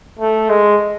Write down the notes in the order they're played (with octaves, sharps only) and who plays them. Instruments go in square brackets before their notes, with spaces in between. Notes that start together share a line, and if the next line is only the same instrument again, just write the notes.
[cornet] A3
G#3